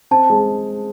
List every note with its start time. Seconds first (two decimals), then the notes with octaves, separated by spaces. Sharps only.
0.11 C4 A5
0.30 G#3